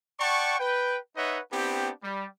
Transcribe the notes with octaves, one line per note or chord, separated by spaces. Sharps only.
D5 F#5 G5 A5 C#6
B4 G5
D#4 B4 C#5 D#5 E5 F#5
B3 C4 D4 E4 G4
G3